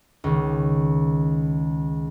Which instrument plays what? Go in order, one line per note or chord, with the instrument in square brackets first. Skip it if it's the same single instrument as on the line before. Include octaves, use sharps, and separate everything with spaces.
[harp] C#2 D#3